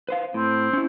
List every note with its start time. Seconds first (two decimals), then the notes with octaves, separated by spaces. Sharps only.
0.09 B4 C5 F5
0.34 A2 C4
0.73 C#4 E4